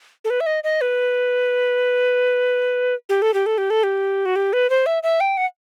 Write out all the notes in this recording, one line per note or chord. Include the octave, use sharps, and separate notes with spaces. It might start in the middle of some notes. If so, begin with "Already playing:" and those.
A4
B4
E5
D#5
D#5
B4
G4
A4
G4
A4
G4
A4
G4
F#4
G4
B4
C5
E5
E5
G5
F#5